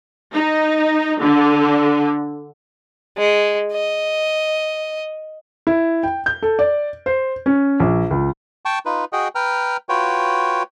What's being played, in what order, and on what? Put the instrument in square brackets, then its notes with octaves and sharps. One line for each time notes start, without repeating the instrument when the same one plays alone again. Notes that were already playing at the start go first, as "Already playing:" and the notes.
[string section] D#4
D3
[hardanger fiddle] G#3
D#5
[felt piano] E4
G5
G6
A4
D5
C5
C#4
A#1
C#2
[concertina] G5 A5 C#6
D#4 F4 B4
F#4 G#4 D#5 F#5 G5
B4 G5 A#5 F6
F4 F#4 B4 C#5 G5